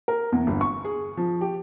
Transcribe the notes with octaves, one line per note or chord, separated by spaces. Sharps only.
A#4
E2
G1
C#6
G#4
F3
G4